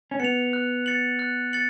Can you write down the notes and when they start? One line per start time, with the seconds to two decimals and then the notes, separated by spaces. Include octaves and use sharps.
0.11 C#4
0.20 B3 C#7 F7
0.53 F#6
0.86 A6 C#7 F#7
1.19 F#6
1.53 A6 C#7 F#7